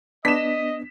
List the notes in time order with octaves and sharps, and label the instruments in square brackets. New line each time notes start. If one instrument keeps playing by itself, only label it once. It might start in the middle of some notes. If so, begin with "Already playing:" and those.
[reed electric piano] B3 D4 [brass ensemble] D#5 [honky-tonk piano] B6 E7